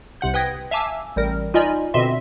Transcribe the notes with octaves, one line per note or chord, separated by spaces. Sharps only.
C2 C3 F#5 G6
B4 G5 D#6 G#6 A#6
E5 F5 G#5 A5 D6 E6
A1 G3 A#4
D#4 F4 D5 D#5 G#5 B5
B2 D3 C4 D#5 E5 C6